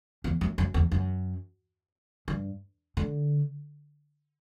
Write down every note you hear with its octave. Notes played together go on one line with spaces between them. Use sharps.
E2
F#2
F#2
E2
F#2
G2
D3